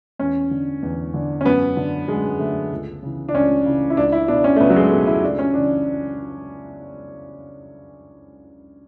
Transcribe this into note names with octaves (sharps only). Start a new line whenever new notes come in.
E2 C#4
D3
E2
D3
C#4
F#2 B3
D3
F#2 G#3
D3 A3
C#2
C#3 E3
D4
C#2 C#4
C#3 E3
E4
C#2 D4
E4
B2 D4
C#4
A3
C#2 B3
F#3
G#3
B2 A3
E4
C#2 D4
C#4
C#3 E3 D4